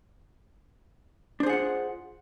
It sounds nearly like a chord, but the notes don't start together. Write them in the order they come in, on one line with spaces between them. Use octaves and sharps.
D4 C5 G#4 F#5 F4